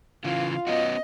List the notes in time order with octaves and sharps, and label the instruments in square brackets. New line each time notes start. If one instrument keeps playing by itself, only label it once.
[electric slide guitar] C#3 E3 [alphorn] F4 [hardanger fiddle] F5
[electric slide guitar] B3 C#4 F#4 [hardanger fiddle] D#5